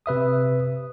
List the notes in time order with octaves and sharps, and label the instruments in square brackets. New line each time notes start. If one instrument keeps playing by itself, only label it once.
[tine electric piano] C3 B4 E5 D#6